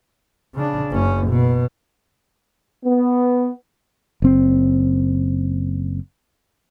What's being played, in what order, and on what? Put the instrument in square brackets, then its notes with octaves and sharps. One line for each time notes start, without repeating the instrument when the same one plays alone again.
[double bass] C#3 D4
F#1 C#4
B2
[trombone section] B3
[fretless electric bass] F#1 C4